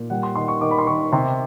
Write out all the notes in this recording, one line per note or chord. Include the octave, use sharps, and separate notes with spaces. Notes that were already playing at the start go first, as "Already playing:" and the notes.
Already playing: A#2
G3 F#5
C6
D#3 C6
C#6
D#3 D6
B5
C6
D#3 C#6
C3 C6